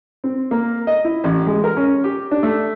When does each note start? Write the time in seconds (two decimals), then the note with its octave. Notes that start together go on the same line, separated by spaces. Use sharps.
0.24 C4
0.51 A#3
0.87 D#5
1.05 E4
1.24 A1
1.46 G#3
1.64 A#4
1.77 C#4
2.04 G4
2.31 D4
2.43 A3